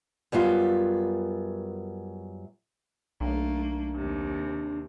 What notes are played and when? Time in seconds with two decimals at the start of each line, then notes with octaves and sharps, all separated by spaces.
0.32 F#2 G3 B3 F4
3.21 B1 A3 A#3 D4
3.94 D#2 C3